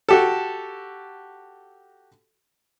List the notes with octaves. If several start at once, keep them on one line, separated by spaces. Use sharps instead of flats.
F#4 G4 A4